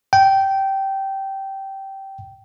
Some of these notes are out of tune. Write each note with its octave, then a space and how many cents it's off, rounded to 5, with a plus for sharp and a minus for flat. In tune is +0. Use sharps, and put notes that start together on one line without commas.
G5 -15